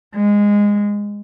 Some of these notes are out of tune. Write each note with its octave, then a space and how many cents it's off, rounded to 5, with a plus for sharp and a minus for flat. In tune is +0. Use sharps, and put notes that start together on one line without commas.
G#3 -15